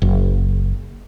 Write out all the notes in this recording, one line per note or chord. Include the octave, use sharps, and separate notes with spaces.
F#1